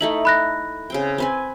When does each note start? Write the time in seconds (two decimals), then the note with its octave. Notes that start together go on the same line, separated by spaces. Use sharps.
0.01 A3 D#4 E4 F#7
0.25 B5 F#6 A#6
0.90 C#3 C4 G5
1.18 C4 B4 G#5